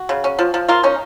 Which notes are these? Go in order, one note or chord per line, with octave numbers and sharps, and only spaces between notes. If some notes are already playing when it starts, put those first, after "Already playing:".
Already playing: F#4
C#3
C#4
F3
F3
A#3 F4
C#4 D#4